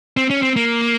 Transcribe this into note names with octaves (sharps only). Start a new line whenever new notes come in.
C4
C#4
C4
A#3